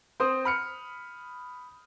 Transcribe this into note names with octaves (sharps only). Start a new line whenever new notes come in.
C4 C5 D#6
B5 F6 C#7